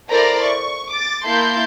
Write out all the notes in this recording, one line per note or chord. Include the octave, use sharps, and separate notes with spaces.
E4 A4 A#4 C5 D5 A#5
C#6
D6 A6
A#3 E4 A5 C6 G6